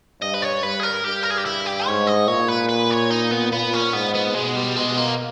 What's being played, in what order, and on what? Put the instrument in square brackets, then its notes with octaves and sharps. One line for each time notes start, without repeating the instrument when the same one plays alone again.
[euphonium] G2 [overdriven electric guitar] D#5
[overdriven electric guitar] B4
C#5
[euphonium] G2 [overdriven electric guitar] B4
[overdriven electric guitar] G#4
A#4
[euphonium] G2 [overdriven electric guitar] G4
[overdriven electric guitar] A#4
G#4
G4
E4
G4
[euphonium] G#2 [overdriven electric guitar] C#5
[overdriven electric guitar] D#5
[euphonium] A#2 [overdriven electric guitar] C#5
[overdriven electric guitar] B4
B4
C#5
D#4
B3
[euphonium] A#2 [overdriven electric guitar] B3
[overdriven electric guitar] C#4
[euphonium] G#2 [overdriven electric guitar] B3
[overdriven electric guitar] B3
[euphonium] B2 [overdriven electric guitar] G#3
[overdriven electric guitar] G3
[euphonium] B2 [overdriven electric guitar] G#3
[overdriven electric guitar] A#3